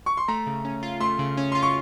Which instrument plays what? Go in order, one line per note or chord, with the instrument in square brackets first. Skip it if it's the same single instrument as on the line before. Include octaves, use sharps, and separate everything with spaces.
[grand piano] C#6
C6
[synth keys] A3 [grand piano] A#5
[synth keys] C#3
C#4
F4
[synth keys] A3 [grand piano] C6
[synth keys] C#3
C#4
[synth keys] F4 [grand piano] C6
[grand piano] C#6